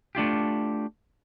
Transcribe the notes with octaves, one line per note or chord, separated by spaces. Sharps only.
A3 D4 F4 G4